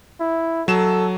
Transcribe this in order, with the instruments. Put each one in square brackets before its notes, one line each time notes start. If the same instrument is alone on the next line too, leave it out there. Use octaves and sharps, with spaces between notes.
[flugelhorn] E4
[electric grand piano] F#3 E7 [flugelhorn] A4